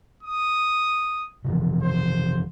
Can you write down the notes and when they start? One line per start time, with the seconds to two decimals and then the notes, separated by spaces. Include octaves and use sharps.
0.23 D#6
1.45 C3 E3 F3
1.83 C5